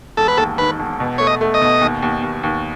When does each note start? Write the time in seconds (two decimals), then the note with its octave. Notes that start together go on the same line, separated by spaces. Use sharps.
0.17 E1 A4
0.28 B4
0.37 D#2 A4
0.58 D#3 B4
0.80 E1
1.00 B2
1.18 A3 C#5
1.27 D#5
1.41 A3
1.54 D#5
1.61 B2
1.81 D#2
2.02 D#2
2.23 D#2
2.43 D#2